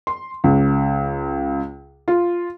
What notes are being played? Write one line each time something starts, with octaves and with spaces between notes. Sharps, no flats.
C6
C#2
F4